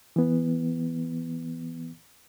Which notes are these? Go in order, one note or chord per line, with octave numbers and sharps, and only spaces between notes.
E3 B3